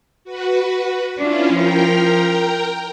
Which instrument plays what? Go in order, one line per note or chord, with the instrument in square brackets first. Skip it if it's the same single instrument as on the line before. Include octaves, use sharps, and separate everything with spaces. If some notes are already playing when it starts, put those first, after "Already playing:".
[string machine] F#4 B4
[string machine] C#4 E4 F4 [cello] D4
[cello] F3 [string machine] A#4 G5 A#5